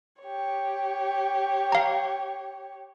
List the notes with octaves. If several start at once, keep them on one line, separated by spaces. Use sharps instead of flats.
G4 C#5
F5 A#5